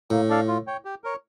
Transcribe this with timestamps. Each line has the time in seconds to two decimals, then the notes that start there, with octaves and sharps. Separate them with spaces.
0.10 A2 A#3
0.29 D4 A4 D5 F5
0.48 F4
0.67 C#5 G5
0.85 G4
1.04 A#4 C#5